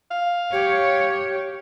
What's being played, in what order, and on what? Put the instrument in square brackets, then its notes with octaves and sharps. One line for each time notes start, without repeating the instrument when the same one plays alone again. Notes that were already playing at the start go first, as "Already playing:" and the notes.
[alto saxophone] F5
[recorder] G4 [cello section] C#5